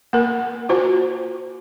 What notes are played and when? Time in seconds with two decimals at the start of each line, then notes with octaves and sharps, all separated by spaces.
0.13 A#3 A#4
0.69 F4 F#4 C5